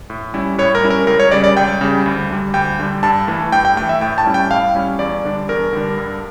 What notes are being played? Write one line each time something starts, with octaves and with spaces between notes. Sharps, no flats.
A2
G3 C#4 E4
A2 C#5
A#4
G3 C#4 E4
A#4
C#2 A#4
C#5
C#3 G3 D5
D5
C#2 G5
C#3 G3
D2
D3 G3
D2 G5
D3 G3
G2 A5
E3 A3
G2 G5
G5
E3 A3 G5
E5
A2 G5
A5
G3 C#4 E4
G5
A2 F5
G3 C#4 E4
E2 D5
D3 G3 D4
E2 A#4
D3 G3 D4
G2